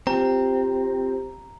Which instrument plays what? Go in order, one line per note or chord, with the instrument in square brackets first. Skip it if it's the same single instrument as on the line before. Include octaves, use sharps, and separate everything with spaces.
[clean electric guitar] C4 [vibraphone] F4 G4 [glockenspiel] A#5